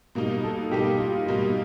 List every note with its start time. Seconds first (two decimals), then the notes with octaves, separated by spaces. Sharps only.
0.15 B2 G3 A#3 D#4
0.43 A4
0.71 B2 G3 A#3 D#4 G4
1.00 F4
1.28 B2 G3 A#3 D#4